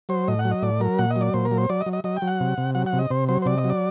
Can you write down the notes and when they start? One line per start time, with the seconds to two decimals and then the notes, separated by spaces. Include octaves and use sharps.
0.09 F#3 C5
0.28 A2 D#5
0.39 F#5
0.45 F#3
0.51 D#5
0.62 A2 D5
0.80 F#3 A#4
0.99 A#2 F#5
1.10 D#5
1.16 F#3
1.21 D5
1.34 A#2 C5
1.45 A#4
1.51 F#3
1.57 C5
1.70 F#3 D5
1.81 D#5
1.86 F#3
1.93 D#5
2.04 F#3 D#5
2.17 G5
2.22 F#3
2.27 F#5
2.40 C3
2.58 C3
2.75 F#3 F#5
2.86 F#5
2.93 C3
2.99 D#5
3.10 C3 C5
3.29 F#3 C5
3.42 C5
3.45 C3 D5
3.58 D#5
3.64 F#3
3.70 D5